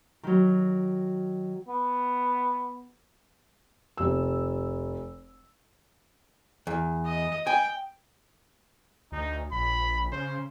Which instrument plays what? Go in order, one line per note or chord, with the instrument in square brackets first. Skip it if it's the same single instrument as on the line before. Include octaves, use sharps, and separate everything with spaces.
[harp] D#3 F#3
[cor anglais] B3
[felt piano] F1 E6
[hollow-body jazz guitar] E2
[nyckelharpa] D#5
[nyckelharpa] G5 [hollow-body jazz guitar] G#5
[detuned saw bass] D2 [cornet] D#4
[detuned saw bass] A#1 [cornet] B5
[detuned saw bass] C#3 [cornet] C5